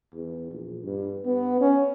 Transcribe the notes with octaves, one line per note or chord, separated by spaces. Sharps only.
E2
A#1
G2
B3
C#4